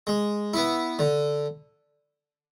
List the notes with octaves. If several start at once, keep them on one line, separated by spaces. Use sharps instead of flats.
G#3
B3 E4
D3